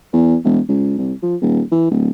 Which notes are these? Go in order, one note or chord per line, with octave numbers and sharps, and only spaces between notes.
E2
E1
C#2
C2
F3
D#1
E3
D1